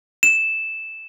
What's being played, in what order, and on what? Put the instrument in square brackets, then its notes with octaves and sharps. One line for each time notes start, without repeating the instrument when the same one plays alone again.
[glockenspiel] E7